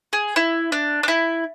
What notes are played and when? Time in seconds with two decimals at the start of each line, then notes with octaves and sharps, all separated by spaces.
0.13 G#4
0.36 E4
0.72 D4
1.03 D4
1.08 E4